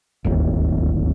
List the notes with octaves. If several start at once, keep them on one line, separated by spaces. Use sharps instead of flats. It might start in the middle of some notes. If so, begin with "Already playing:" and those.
D1 G1 D#2